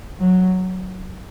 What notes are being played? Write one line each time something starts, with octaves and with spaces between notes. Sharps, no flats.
F#3